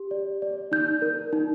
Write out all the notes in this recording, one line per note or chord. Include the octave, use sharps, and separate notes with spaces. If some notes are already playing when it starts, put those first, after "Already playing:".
Already playing: G4
D5
D5
D#4 G6
A#4
D#4